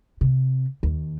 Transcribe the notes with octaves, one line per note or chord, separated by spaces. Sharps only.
C3
D#2